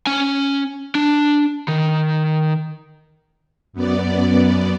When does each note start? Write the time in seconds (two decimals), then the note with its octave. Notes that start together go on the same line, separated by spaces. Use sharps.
0.07 C#4 G#5
0.95 D4
1.68 D#3
3.73 F#2 B3 D5